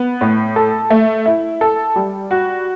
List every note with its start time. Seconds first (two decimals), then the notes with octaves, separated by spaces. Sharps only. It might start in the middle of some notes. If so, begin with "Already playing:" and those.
Already playing: B3
0.21 A2
0.56 A4
0.90 A3
1.26 E4
1.61 A4
1.96 G3
2.31 F#4